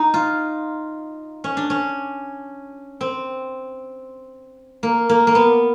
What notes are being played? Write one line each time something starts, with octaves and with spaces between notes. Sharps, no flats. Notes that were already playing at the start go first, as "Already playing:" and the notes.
Already playing: D#4
F4
C#4
D4
C#4
C4
A#3
A#3
A#3
B3